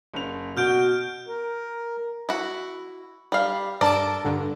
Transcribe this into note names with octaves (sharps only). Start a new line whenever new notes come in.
F#1 C#4 F7
B2 F#4 F6 G6 D7 G7
A#4
E4 F#4
G3 F5
G2 A4 A#4 D5 A5 D7
G2 D3